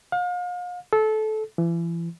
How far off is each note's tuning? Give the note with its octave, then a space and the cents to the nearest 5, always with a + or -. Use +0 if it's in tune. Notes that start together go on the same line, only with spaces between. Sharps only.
F5 +40
A4 -20
E3 +35